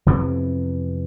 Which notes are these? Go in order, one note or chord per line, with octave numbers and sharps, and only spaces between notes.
F2 C3 E3 B3